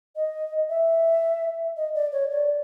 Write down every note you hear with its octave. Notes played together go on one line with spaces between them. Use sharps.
D#5
E5
D#5
D5
C#5
D5